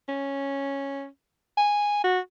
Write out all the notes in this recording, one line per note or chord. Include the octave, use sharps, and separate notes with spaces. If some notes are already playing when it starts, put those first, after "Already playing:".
C#4
G#5
F#4